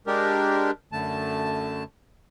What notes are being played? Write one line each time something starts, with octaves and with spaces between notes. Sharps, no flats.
G#3 D4 G4 A#4
F#2 D3 A3 A5